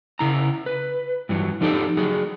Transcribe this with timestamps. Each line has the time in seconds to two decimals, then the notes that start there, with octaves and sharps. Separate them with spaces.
0.19 C#3 E4 A#5
0.66 B4
1.29 G2 E3 F#3
1.61 F3 D#4 G4 A4 D5
1.97 F#3 F#4 G#4